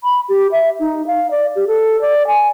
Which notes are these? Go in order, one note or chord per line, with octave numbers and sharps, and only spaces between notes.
B5
G4
E5
D#4
F5
D5
G4
A4
D5
G#5